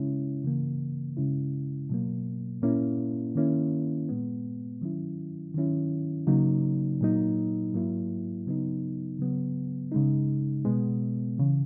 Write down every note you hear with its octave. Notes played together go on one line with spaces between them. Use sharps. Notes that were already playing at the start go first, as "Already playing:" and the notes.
Already playing: C#3 G#3 C#4 E4
C#3 E3 A#3
C#3 G#3 C#4 E4
B2 F#3 A#3
A#2 A#3 C#4 E4
D#3 A#3 C#4 E4
A#2 G#3 B3
D#3 F#3 C#4 E4
D#3 F#3 C#4 E4
C#3 F#3 A#3 D#4
A#2 F#3 A#3 D#4
G#2 F#3 A#3 E4
C#3 F#3 B3 D#4
C#3 F#3 B3
C#3 G#3 D#4
B2 G#3 B3
C#3 E3